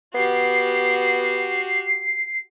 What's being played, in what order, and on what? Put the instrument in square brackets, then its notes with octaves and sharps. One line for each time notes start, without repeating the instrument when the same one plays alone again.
[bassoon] B3 [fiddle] F#4 G4 [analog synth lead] C7